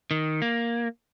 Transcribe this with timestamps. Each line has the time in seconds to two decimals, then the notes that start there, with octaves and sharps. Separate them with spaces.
0.11 D#3
0.42 A#3